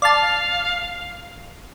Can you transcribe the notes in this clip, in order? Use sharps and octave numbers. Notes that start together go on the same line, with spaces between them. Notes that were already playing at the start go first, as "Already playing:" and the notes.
D5 F5 A5